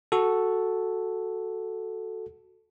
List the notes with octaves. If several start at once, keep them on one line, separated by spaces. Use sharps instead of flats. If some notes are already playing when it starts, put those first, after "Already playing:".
F#4 A4